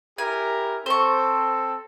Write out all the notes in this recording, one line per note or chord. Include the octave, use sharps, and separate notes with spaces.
E4 G4 A#4 G#5
C4 A4 C5 C#6